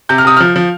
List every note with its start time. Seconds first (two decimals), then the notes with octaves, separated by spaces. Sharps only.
0.09 C3 G6
0.18 F6
0.25 C3 D#6
0.37 F3 F6
0.56 F3